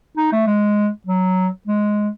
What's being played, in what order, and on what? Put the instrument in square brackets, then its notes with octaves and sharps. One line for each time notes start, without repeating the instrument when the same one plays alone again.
[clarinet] D#4
A3
G#3
F#3
G#3